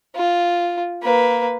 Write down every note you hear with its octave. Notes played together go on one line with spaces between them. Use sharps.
F4
A#3 B4